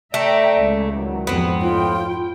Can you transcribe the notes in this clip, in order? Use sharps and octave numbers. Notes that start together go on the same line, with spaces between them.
A3 D5 E5 G5 A#5
C#2
D#3 E3 F#3
F2 G#2 B3 C4
F2 A2 D#4 F4 G5